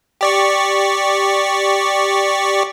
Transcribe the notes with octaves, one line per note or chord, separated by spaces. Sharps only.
G4 D5 C#6